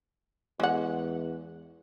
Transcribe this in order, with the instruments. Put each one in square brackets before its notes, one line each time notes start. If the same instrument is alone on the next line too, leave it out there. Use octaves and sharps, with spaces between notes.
[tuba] E2 [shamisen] G#3 F#5